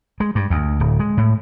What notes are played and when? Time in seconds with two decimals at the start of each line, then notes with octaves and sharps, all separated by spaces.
0.20 G#3
0.35 G2
0.50 D2
0.80 D1
1.00 G#3
1.17 A2